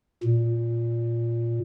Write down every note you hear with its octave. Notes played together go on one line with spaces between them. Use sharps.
A#2